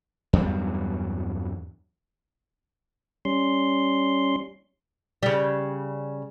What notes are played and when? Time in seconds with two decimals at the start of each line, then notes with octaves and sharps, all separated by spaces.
0.33 E2 G2 F#3 G3
3.25 G3 C#4 C6
5.23 C#3 G3